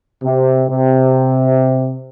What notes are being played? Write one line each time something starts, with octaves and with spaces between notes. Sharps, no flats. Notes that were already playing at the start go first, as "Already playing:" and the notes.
C3
C3